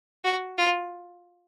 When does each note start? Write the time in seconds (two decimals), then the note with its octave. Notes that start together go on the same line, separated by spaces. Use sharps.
0.24 F#4
0.58 F4